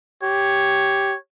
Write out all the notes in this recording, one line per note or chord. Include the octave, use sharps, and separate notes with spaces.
G4 C#5